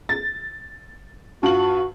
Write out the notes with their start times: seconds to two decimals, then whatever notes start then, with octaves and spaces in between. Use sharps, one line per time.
0.09 A6
1.43 G2 F4 F#4 F#7